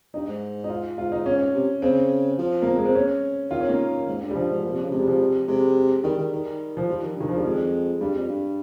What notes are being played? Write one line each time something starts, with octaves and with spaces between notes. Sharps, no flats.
G2 D#4
G#2
D#4
F4
G#2 F4
D#4
C#4
C3
C#3 C4
F3
A#3
C4
G#3
C4
C#4
D#3 F4
C#4
A#3
G#2
G2
G3
G2 F3
G#2
A#2
C3
C#3
C3 G#3
G3
F3
G3
C3 G#3
D#3 G3
D#3
D#3
F3
F3 G3
D#3
G2 D#3
G2 F3
G3
F2 G#3
G2 G3
F2
G2